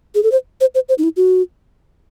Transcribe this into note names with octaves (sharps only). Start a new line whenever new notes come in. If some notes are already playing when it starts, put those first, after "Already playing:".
G#4
A4
C5
C5
C5
C5
D#4
E4
F#4